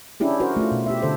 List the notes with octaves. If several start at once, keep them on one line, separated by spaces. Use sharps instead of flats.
C#4 D4 E4 G4 G#4
F#4 A#4 C5
A3 F4
B2
G4 E5
D3 A4 C5